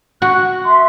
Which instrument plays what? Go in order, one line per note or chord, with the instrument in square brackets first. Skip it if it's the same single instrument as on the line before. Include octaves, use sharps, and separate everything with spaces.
[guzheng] F#4 [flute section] F#6
[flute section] E5 C6